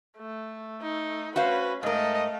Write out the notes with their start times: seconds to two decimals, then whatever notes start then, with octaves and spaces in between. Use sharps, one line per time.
0.18 A3
0.82 D#4
1.36 C#4 F#4 B4 C5 F5
1.83 G#2 A3 A#4 D#5 F5